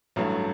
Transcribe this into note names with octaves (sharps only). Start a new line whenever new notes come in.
A1 G2 F#3 A3